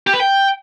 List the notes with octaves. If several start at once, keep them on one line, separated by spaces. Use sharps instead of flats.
G4
B4
G5